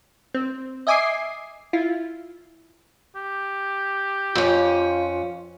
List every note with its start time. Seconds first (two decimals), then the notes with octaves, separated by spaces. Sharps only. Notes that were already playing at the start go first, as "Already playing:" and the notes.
0.34 C4
0.87 D#5 E5 G#5 D6 D#6 C7
1.73 E4 F4
3.15 G4
4.35 F2 C#4 F4